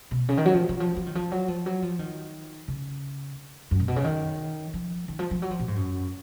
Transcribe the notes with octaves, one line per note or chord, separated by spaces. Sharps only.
B2
C#3
D#3
F#3
F3
D#3
F3
F3
D#3
F3
F#3
F3
F#3
F3
D#3
C#3
F#2
A#2
B2
C#3
D#3
F3
D#3
F3
F3
F#3
F3
A#2
G#2
F#2